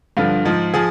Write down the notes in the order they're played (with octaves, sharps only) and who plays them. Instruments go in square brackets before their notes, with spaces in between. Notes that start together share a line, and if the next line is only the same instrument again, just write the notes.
[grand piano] G2 D3 F3 F4
G#2 F3
F3 G#4